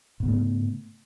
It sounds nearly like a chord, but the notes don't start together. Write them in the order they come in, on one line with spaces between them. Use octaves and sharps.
G#2 B3 C#3 A3